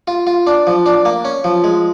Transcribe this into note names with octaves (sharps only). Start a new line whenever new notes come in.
F4
F4
D4
F3
D4
A#3
C#4
F3
G#3